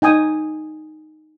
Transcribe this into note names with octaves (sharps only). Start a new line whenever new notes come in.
D#4 G5 G#5 D#6